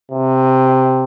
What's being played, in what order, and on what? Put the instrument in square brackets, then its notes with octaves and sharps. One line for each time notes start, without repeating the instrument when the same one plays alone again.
[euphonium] C3